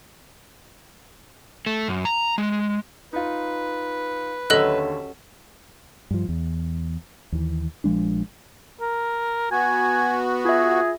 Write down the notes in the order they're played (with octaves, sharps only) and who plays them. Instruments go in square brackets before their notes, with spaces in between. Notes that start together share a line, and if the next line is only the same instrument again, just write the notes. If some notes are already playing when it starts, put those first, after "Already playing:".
[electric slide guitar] A3
F#2
A#5
G#3
[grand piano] D#4 F4 [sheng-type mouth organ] B4
[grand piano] D#2 D3 [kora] F#3 C#4 E5 [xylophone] A4 D#5 F#6
[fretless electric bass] G2 F3
E2
D#2 E3
A#1 F3 G#3 D4
[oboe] A#4
[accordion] B3 F#4 [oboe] G#5
[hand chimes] F4 E5 [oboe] G#4